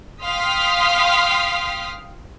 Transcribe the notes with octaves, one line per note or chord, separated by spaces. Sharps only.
F5 G5 C6 D#6 F6 B6